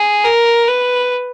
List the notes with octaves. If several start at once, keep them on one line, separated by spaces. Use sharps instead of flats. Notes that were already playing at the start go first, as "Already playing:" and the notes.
Already playing: G#4
A#4
B4